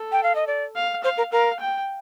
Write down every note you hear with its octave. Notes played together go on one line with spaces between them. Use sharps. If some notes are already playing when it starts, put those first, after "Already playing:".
Already playing: A4
G5
F5
D#5
D5
F5
C5 F5
A#4
A#4 F5
G5